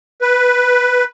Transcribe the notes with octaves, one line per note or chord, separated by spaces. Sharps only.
B4